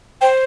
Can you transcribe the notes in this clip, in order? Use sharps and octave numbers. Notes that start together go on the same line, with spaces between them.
C5 G5